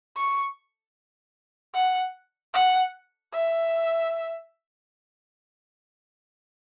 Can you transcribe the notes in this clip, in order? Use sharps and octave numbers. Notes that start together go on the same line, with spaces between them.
C#6
F#5
F#5
E5